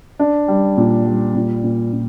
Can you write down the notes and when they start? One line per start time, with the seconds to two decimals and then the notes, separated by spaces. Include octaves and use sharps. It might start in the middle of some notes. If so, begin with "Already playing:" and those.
0.19 D4
0.48 G3
0.77 A#2
1.06 G3
1.35 A#2
1.64 A#2
1.93 A#2